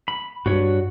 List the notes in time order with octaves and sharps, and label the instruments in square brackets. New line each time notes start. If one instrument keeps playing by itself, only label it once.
[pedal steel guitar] B5
[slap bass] G2 [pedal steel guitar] F#4 C#5